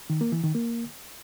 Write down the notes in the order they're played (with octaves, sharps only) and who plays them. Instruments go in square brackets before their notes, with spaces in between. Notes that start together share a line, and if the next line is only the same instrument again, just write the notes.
[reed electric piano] D#3
A#3
E3
D#3
A#3